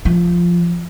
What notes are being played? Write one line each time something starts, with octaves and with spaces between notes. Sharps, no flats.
F3